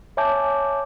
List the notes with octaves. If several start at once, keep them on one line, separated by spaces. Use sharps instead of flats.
C#5 E5 G#5 A5 D6 G6